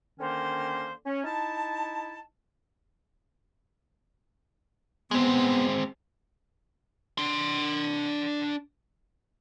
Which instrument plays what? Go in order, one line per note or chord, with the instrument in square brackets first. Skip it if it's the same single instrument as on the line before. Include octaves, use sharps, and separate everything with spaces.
[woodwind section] D3 D#3 A#3 C#4 C5
C#4
D#4 E4 A5
[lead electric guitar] G#3 C4 [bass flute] B3
[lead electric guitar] D4 C6